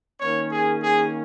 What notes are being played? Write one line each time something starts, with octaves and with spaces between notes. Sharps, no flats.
D#3 A#3 C#4 C#5
G#4
G#4